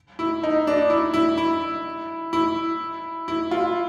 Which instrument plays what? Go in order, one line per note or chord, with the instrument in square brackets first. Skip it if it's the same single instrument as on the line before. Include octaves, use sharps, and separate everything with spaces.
[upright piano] E4
D#4
D4
E4
E4
E4
E4
E4
F4